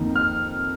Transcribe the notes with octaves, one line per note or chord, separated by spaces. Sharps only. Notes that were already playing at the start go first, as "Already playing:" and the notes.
Already playing: F2 D#3 A#3 D#4
F6